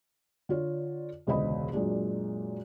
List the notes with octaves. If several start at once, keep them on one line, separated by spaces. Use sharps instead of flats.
D3 F4 C#5
E1 C#2 D3 C5 D#5 B5
F#2 A#2 G#3 D4